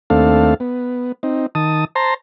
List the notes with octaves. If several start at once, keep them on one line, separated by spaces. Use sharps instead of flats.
D#2 A3 C4 D4 A4 F5
B3
C4 D#4
D#3 A5 D#6
C5 A5 A#5 C6